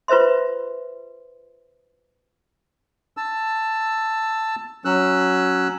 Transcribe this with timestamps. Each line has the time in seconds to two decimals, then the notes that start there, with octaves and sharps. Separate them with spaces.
0.08 F4 B4 C5 E5 C6
3.17 A5 E6
4.85 F#3 C#4 E6 F#6